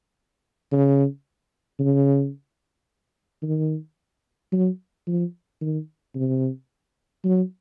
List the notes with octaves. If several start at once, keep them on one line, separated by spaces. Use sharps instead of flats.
C#3
C#3
D#3
F#3
F3
D#3
C3
F#3